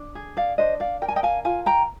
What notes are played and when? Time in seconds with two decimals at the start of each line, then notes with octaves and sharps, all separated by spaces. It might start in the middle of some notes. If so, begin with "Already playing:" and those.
Already playing: D4
0.15 G#4
0.37 D5 F5
0.58 D4 C5 D#5
0.80 D5 F5
1.02 A#4 G5
1.08 G#5
1.16 D#5 G5
1.23 F5 G#5
1.45 F4 F5 G#5
1.66 G5 A#5